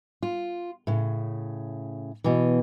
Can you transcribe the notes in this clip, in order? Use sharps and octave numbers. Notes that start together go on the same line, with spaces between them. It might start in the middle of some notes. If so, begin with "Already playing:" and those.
F4
A2 C#3
B2 E3